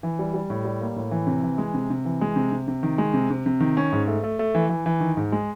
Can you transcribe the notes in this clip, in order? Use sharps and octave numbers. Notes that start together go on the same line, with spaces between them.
E3
G3
G3
A2
G3
A#3
A2
E3
C3
E3
G#3
C3
C3
E3
G#3
C3
C3
C3
D#3
G#3
C3
C3
C3
D#3
C#4
G#2
A3
A3
A3
E3
E3
E3
D#3
G#2
G#3